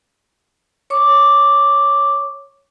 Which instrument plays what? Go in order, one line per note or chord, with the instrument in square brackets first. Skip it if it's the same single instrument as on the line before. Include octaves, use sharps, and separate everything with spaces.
[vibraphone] C#5 C#6 D6